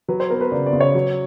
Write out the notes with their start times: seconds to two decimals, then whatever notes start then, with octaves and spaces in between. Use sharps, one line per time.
0.08 F#3 B4
0.20 C5
0.30 B3 A#4
0.41 B4
0.52 C#3 D5
0.66 D5
0.73 C#3
0.80 C#5
0.94 F#3